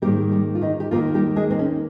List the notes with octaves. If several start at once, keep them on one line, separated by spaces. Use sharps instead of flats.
G#2 D#3 G3 A#3 G4
G3 G4
F4
D#3 D#4
G4
D#2 D#3 F3 A#3 F4
G3 G4
G#3 G#4
C4
C#4